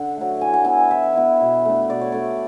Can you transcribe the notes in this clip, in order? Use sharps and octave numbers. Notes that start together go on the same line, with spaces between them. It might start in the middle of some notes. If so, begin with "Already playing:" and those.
Already playing: D3 F#5
F#3 A3
E3 G#5
F#5
B3 E4 G#5
E3 E5
B3 E4
B2
A3 D4
B2 D5
C#5
A3 D4 D5